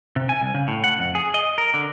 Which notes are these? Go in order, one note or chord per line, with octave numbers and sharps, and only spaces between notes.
C3
G#5
C2
C#3
A2
F#5
F2
G#4
D#5
A#4
D3